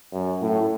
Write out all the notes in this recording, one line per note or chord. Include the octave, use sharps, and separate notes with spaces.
F#2
A2